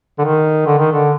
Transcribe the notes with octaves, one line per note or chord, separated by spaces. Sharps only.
D3
D#3
D3
D#3
D3